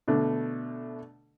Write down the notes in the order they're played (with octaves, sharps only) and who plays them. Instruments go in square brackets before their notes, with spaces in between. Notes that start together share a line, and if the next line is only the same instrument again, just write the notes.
[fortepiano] B2 D3 A3